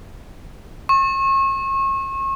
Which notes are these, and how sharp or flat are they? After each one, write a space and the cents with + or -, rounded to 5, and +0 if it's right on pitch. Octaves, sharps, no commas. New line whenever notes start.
C#6 -35